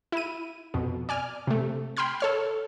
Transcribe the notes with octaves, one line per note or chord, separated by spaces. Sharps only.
E4 D#7
F2 B2
D5 G#5 F6
C3 A3
G5 B5 C6 F6 G#6
A4 C#5 F6